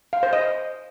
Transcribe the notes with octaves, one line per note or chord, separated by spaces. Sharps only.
F5
C5
D#5